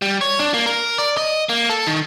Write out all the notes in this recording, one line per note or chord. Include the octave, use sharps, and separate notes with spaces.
G3
C#5
D4
A#3
A#4
D5
D#5
A#3
A4
D#3